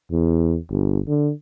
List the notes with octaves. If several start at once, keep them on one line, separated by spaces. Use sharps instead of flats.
E2
G1
D3